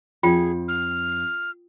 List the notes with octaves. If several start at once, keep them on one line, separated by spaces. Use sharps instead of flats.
F2 F4 G#4 G5
F6